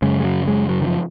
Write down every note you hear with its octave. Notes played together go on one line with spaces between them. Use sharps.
F#2 C#3 G#3
G#3
F#3
G#3
F#3
D#3
F3